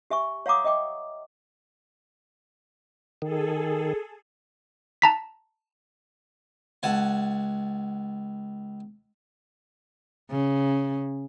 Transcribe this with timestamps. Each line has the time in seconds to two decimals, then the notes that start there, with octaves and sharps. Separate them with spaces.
0.10 G4 E5 G#5 C#6
0.46 C#5 F5 F#5 A#5 D6 D#6
0.64 D#5 E5 G5 D6
3.22 D#3 G#4 A4
5.02 A5 A#5 B6
6.83 C#2 F#5 G#5 A5
10.31 C#3